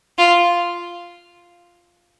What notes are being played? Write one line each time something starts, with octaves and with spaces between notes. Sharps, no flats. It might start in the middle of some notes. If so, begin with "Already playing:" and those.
F4